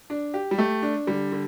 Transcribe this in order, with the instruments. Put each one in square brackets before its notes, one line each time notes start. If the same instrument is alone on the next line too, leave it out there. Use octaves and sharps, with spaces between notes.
[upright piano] D4
G4
[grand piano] G3
[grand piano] A3 [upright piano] G4
[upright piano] D4
[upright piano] D3 [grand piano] G3
[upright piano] D3